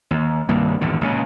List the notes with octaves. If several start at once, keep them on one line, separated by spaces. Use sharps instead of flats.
D#2
C2 G2 D#3 A#3
G#1 E2 A2 D3
C#2 A#2 C#3